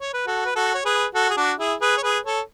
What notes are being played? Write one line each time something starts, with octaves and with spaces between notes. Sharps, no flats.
C#5
B4
F#4 A4
B4
F#4 A4
C#5
G#4 B4
F#4 A4
G#4
D4 F#4
E4 G#4
G#4 B4
C#5
G#4 B4
A4 C#5